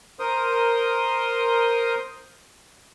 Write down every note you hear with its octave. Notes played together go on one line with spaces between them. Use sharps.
A#4 C5 C6 D#6